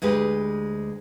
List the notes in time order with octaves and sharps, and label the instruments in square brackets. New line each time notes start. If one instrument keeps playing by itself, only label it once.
[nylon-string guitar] D2 G#3 G4 B4